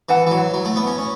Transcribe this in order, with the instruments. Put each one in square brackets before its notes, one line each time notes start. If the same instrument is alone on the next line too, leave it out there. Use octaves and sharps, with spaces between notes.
[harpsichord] E3 [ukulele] E4 B4 F#5 A5
[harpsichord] E3
F#3
F#3
A3
B3
C#4
C#4